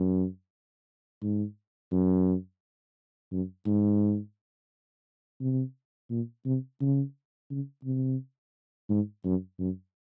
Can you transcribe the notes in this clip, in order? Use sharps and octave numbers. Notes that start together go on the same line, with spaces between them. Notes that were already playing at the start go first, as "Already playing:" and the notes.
Already playing: F#2
G#2
F#2
F#2
G#2
C3
A#2
C3
C#3
C#3
C3
G#2
F#2
F#2